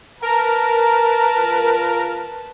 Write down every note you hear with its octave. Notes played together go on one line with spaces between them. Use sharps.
A#4 B4 A5 A#5
C#2 F4